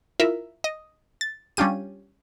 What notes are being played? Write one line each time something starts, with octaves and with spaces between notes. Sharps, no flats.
E4 F4 A#4 E5
D#5
A6
G3 C#4 D4 F4 G4 D#7